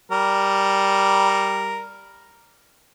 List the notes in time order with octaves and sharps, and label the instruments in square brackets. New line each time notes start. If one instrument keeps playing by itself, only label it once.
[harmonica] G3 A#4